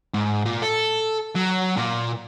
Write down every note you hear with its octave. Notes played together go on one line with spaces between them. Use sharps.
G#2
A#2
A4
F#3
A#2